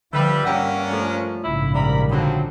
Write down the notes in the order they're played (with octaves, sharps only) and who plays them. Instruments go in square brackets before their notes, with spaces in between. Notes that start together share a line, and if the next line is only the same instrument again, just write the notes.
[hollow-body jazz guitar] D3 [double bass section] F3 [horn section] G3 B4 [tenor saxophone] E5
[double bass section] G2 [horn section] A#3 C#4 D4 [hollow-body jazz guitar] F#5 G5
[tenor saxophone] F3 [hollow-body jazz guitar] A3
[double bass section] A#1 G#2 C#3 [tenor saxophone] E4
[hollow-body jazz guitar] B1 [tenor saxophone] G3 [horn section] A#4 B5
[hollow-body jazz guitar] D2 D3 [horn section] F3 F#3 C4